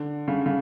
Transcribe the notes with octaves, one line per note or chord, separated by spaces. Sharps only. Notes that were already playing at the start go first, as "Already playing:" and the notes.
Already playing: D3
C#3
C#3